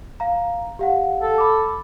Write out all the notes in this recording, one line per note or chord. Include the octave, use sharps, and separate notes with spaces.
F5 A#5
G4 F5 F#5
A4
B5 D6